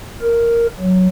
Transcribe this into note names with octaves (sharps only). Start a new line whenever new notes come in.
A#4
F#3